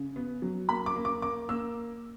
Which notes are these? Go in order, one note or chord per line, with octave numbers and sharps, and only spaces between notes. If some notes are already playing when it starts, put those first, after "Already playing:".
Already playing: C#3
B3
F#3
A#3 B5
D6
A#3
D6
A#3 D6
A#3 E6